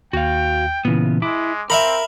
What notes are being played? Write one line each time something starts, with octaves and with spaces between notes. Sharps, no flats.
D#2 F#4 F5 G5
A#2 C#3 E3 B3
G#3 E4 D6
C4 A#4 E5 F5 B5